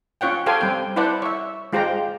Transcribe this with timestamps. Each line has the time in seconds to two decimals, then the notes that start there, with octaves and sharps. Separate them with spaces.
0.21 C#4 F4 C#5 F#5 G5
0.46 G4 A4 C5 F5 G5 G#5
0.61 G3 C4 G5
0.96 E4 B4 C5 D5 F#5 A5
1.22 C#5 E5
1.73 G#3 F4 G4 C5 G5 A#5